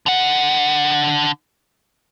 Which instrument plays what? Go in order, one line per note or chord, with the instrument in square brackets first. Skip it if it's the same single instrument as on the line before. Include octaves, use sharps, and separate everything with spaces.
[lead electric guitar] D3 F#5